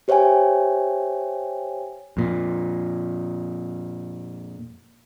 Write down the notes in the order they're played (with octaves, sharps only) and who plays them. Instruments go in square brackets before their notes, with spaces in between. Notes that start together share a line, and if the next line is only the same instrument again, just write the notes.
[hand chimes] G4 C5 C#5 E5 G5 G#5
[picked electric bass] F2 A#2